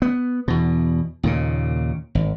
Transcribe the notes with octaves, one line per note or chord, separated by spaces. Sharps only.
B3
E2 B2
D#2 A#2 C#3
G#1